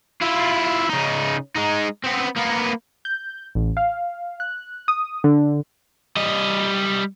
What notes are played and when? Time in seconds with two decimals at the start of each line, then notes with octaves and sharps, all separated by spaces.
0.21 E4 F4
0.90 C#3 D#4
1.55 G#3 D#4
2.04 B3 C4
2.36 A#3 B3
3.05 G6
3.55 A1
3.77 F5
4.40 F#6
4.88 D#6
5.24 D3
6.16 G3 D#5